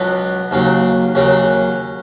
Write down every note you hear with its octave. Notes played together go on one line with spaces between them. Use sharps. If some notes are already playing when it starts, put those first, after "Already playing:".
Already playing: C#2 B2 F#3 B3
D#2 C#3 F#3
D#2 C#3 F#3 C#4